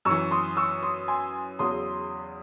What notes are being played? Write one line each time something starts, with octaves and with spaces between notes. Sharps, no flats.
F#2 E3 C#6 E6
C6 D#6
C#6 E6
C6 D#6
G#5 C6
E2 C#3 F#3 C6 D#6